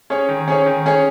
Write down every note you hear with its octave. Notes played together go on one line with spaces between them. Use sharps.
C#4 G#4 C#5
D#3
C#4 G#4 C#5
D#3
C#4 G#4 C#5